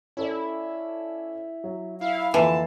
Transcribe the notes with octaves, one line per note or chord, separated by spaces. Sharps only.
C#4 E4 A4 D5
F#3
E4 E5 F5
F2 D3 E3 A#3 A5 C7